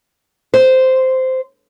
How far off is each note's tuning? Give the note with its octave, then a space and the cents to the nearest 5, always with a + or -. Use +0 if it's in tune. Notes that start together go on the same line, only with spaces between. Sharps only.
C5 -10